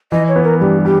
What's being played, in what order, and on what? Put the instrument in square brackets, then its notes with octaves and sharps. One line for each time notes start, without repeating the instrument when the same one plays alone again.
[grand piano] E3 [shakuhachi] D#5
[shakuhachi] C#5
[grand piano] B3
[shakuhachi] A#4
[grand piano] G2 [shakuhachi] G4
[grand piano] G3 [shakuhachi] G4